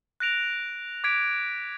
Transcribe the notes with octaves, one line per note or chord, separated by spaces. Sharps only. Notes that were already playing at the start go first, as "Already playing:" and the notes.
F#6 A#6 D7 F7
D6 G#6 B6 D7 F7